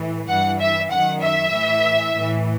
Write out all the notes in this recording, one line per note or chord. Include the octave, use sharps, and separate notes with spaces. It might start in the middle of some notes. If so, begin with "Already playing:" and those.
Already playing: A2 E3
G2 E3 F#5
E5
F#2 D#3 F#5
E5
A2 E3
A2 E3